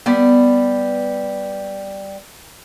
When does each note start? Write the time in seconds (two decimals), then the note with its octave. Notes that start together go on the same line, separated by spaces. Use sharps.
0.06 G3 B3 D5